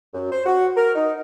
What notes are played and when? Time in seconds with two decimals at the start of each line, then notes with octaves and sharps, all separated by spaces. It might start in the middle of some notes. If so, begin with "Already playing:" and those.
0.14 F#2
0.32 C5
0.46 F#4
0.77 A#4
0.94 D#4